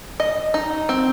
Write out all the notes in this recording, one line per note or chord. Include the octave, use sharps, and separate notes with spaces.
D#5
D#4
C4